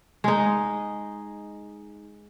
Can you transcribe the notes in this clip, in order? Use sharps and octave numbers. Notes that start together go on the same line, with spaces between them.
G#3 D#4